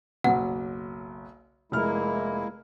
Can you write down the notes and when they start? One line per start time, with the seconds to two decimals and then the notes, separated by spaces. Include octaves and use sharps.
0.24 F#1 B1 F#5
1.72 F1 G#3 A#3 E4 F6